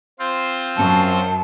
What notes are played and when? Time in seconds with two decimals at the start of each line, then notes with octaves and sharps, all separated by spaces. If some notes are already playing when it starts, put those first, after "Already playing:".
0.19 C4 F4 C5
0.77 F#2 A5